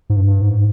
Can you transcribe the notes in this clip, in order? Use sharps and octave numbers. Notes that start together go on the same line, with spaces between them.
G#2
G2
G#2